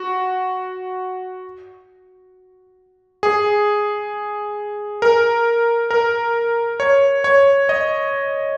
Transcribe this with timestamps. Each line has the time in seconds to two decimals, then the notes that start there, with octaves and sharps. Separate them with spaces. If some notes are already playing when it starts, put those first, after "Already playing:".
Already playing: F#4
3.23 G#4
5.02 A#4
5.91 A#4
6.80 C#5
7.24 C#5
7.69 D#5